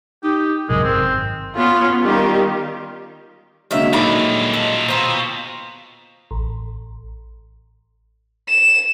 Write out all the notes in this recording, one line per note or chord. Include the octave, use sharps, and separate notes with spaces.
D#4 G4
A1 F#2 C3 G#3 A#4
G#1 C4
B3 C#4 F4
D#3 G3 F4 G4
D3 F#3 G#3 A#3 D#4 E5 F6
D#2 A#2 D#4 A4 D5 B5
A4 D#5 E7 F#7
B2 C4 F4 A#5 C6
A1
E7